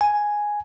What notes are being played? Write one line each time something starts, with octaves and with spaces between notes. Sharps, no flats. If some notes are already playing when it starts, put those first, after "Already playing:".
G#5